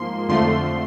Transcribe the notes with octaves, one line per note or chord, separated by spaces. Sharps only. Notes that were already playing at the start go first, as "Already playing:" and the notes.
Already playing: G#2 F3 A#3 C6
F2 D3 F3 A3 C6